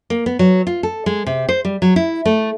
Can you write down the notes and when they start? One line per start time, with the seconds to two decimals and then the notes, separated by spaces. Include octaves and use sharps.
0.10 A#3
0.26 B3
0.39 F#3
0.67 F4
0.83 A4
1.06 G#3
1.26 C3
1.49 C5
1.65 G3
1.82 F#3
1.96 E4
2.25 A3